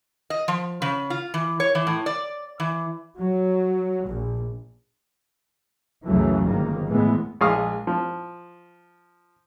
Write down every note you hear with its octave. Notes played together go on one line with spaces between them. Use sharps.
D#5
F3
C#3
F4
E3
C#5
E3
A2
D5
E3
F#3
A#1
C#2 F#2 C#3 E3 F#3 A3
G1 G#2 D#3 A#3
A2 E3 G#3 B3
A#1 G#3 F5 C#6 D#6
F3